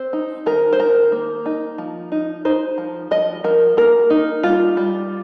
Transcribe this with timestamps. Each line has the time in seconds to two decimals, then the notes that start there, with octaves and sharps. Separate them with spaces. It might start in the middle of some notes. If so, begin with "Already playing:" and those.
Already playing: C4 C5
0.13 D#4
0.46 D#3 A#4
0.73 C5
0.80 D#3 A#4
1.12 A#3
1.46 D#4
1.78 F3
2.12 D#4
2.45 D#4 C5
2.78 F3
3.11 F3 D#5
3.44 F3 A#4
3.77 A#3 A#4
4.10 D#4
4.43 G3 F4
4.77 G3